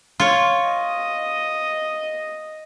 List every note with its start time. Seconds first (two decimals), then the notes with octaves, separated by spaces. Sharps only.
0.20 F4 C#5
0.68 D#5